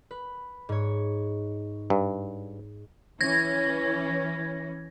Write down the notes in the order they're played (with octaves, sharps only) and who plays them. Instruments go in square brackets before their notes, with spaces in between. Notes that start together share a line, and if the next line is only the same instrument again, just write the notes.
[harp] B4
G#2 C#5
[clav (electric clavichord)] G2
[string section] E3 C#4 [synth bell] G#6 A#6